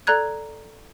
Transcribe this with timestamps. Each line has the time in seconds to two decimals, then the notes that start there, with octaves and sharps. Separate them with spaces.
0.07 A4 D5 A#5 F#6 G#6